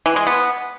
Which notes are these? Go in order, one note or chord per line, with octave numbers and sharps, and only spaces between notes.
E3
G#3
B3